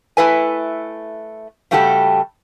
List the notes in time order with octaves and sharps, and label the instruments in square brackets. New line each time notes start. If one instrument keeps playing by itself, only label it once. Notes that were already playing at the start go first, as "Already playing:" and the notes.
[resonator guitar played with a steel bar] A3 E4 B4 G#5
C#3 G3 A3 F#4 G4 A4